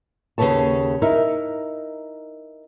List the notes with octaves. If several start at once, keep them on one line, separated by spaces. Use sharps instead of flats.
D#2 C#3 A3 B4 C#5 A5
D#4 E4 A#4